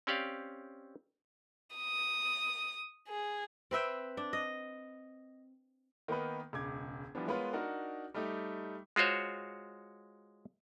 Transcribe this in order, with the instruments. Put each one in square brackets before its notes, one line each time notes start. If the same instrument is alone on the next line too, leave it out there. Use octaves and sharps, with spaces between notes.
[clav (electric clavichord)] C4 C#4 G4 D5 F5
[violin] D#6
G#4
[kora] C4 B4 E5 G5
D4
D#5
[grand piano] D#3 A#3 B3 D#4 B4
E1 C#2 D6 G#6
E3 F3 G3 B3 D4
G#3 B3 F4 A#4 B4 C#5
D4 D#4 F#4 A#4 F#5
G3 A3 D#4 G4
[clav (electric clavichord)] G#3 F4 F#4 C5 C#5